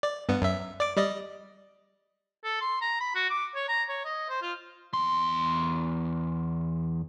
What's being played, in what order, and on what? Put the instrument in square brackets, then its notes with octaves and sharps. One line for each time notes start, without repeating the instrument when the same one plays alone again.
[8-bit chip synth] D5
G2 B3
F#2 E5
D5 D6
G3 D5 D#5
[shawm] A4
C6
A#5
B5
F#4
D6
C#5
A#5
C#5
D#5
C5
F4
[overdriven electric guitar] E2 C6